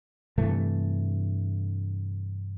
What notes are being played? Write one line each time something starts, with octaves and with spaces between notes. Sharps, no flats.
G2 C3 E3 A3